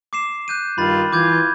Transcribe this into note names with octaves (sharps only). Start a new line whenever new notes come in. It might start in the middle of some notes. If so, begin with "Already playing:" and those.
D6 C7 E7
F#6 G6 D#7
G2 D#3 F4 B5 A6
E3 F4 D6 G6 G#6